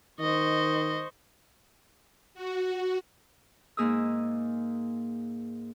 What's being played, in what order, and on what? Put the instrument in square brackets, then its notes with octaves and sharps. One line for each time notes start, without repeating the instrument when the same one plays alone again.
[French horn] D#3 [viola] C5 C#6 [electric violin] D#5
[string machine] F#4
[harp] G#2 A#3 G#4 D#6 E6